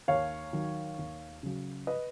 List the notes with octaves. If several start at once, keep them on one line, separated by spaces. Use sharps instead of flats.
D#2 C#5 F5
D#3 F#3
D#2
C#3 F#3
B4 D#5